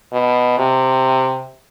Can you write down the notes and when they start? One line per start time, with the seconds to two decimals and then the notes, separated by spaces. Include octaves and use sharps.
0.13 B2
0.59 C3